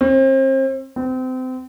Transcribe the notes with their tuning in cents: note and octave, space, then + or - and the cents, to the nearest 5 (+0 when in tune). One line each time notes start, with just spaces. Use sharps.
C4 +35
C4 -30